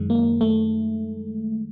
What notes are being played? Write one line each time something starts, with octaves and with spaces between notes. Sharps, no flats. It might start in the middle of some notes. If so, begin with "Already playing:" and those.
Already playing: F#2 D#3 G#3
A#3
A3